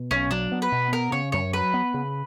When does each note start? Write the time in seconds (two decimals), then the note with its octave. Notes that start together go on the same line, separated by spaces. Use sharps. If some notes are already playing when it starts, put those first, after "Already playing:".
Already playing: B2
0.11 B1 C#4
0.31 F#3 D4
0.52 B3
0.62 B4
0.72 B2
0.92 B3 A#4
1.12 C#3 C#5
1.32 F#2 C#5
1.53 F#3 B4
1.74 B3
1.94 C#3